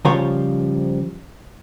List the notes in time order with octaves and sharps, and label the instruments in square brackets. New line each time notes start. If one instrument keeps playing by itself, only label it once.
[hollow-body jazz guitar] C#3 F3 G3 F4 C5 C#5